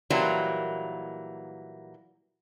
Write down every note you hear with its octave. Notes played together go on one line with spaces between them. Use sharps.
A#2 E3 F#3 G3 A#3